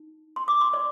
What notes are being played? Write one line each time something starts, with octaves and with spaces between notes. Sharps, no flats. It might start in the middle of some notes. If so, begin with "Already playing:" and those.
Already playing: D#4
C6
D6
C6
D5